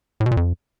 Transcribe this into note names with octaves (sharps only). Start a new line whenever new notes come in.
A2
B2
A#2
F2